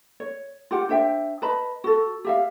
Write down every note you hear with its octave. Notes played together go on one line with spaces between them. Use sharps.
C#5
F4 G4 F#5
D4 C5 E5 G5
B4 D#5 A5 B5
F#4 A4
G4 E5 F5